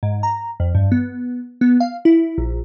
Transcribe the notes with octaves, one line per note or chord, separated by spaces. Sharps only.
G#2
A#5
F2
G2
B3
B3
F5
E4
A#1